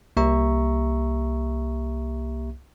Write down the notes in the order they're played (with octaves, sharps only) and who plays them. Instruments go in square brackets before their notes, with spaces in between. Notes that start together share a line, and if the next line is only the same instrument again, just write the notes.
[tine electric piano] C2 A#3 G4 E5 A#5 C#6